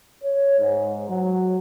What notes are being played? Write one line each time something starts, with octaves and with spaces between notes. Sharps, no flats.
C#5
G#2
F#3